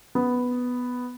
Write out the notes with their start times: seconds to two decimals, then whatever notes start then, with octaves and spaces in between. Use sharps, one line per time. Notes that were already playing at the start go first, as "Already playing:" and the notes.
0.15 B3